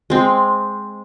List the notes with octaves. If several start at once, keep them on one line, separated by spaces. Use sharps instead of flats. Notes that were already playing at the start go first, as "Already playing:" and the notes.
G#3 C4